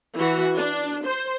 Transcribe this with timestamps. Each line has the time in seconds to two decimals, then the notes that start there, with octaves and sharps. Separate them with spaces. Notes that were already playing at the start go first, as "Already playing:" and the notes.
0.16 E3 F#4
0.56 D4
1.05 C5